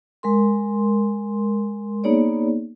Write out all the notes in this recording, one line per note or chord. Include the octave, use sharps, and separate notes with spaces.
G#3 A#4 C6
A#3 B3 D#4 G#4 C#5 D5